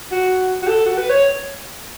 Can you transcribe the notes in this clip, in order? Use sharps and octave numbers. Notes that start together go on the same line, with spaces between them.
F#4
F#4
A4
F#4
B4
C#5